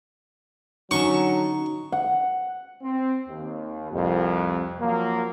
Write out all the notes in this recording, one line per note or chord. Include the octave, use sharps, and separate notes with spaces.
D3 F#3 C#4 D#4 A5 C#6
F#5
C4
D#2
C2 F2
F3 F#3 A#3